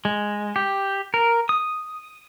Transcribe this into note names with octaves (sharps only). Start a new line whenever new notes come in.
G#3
G4
A#4
D#6